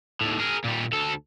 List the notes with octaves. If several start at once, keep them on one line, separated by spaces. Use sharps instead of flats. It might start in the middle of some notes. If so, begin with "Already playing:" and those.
D#2 A2
G#4 A#4
A#2 G3
D2 A4